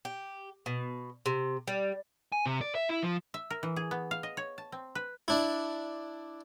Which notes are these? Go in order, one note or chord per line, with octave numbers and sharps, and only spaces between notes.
G4
B2
C3
G3
G#5
C3
D5
E5
E4
F3
E5
A#4
E3
G#4
B3
F5
D#5
C#5
A5
C4
B4
D4 E4